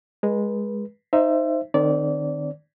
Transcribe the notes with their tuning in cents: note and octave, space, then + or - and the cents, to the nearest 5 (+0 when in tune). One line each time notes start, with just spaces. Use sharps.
G#3 -5 B4 -35
D#4 +0 C5 +0 E5 +30
D#3 -40 C4 -5 D5 -25